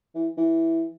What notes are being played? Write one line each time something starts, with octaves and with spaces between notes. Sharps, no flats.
E3
E3